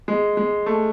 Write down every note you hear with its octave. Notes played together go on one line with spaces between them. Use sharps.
G#3
G#3
A3